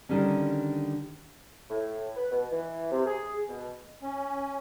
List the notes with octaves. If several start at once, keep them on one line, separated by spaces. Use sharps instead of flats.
D3 D#3 G3 C#4
A2
B4
B2
E3
C3
G#4
B2
C#4